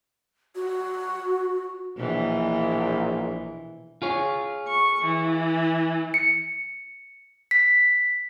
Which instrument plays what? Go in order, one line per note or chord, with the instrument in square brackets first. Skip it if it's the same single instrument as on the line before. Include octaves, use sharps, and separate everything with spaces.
[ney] F#4
[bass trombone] A#1 [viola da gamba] B2 E3
[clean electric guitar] F4 G#4 C#5
[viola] C#6
E3
[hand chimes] C#7
B6